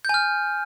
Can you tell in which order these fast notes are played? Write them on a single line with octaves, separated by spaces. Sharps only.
G6 G#5 F6